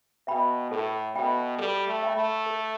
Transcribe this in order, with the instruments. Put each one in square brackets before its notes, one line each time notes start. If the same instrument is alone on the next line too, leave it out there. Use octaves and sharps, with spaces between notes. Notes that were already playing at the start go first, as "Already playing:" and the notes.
[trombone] B2 [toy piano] E5 G5 B5
[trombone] A2 [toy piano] A4
[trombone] B2 [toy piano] E5 G5 B5
[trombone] G3 [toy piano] A4
[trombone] A3
[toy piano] E5 G5 B5
[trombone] A3
[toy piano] A4